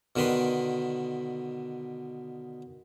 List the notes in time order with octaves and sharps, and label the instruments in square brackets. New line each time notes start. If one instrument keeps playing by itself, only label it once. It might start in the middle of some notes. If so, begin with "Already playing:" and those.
[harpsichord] B2 D3 D#3 B4 C6